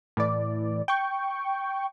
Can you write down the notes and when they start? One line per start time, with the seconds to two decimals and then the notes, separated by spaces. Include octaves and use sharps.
0.17 A2 E3 D5
0.88 G5 C#6